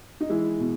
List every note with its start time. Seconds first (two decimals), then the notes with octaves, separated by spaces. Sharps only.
0.21 D#4
0.29 E3 G#3 E4
0.60 B2